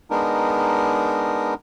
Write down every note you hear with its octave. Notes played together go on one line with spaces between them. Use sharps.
G#3 B3 D4 D#4 A#4